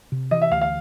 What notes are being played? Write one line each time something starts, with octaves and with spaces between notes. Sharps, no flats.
C3
E3 D#5
E5
D2 F5
F5